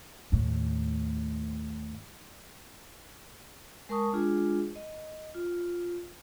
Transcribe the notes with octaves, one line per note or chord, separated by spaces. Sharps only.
D#2 A2
G#3 A#4 A5 C#6 D#6
G#3 D4 F4 G#4
D#5
F4